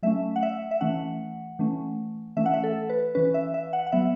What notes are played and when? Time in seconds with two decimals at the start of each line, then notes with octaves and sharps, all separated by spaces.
0.03 F#3 A3 C#4 E5
0.36 F#5
0.43 E5
0.71 E5
0.81 E3 A3 C#4 F#5
1.59 E3 A3 C#4
2.37 E3 A3 C#4 E5
2.46 F#5
2.54 E5
2.64 A4
2.89 B4
3.15 E3 C#4 B4
3.34 E5
3.54 E5
3.73 F#5
3.87 F#5
3.92 F#3 B3 E5